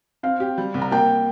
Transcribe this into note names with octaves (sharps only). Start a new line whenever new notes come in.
C4 F5
G4
G3
C2
A#5
A#3 G5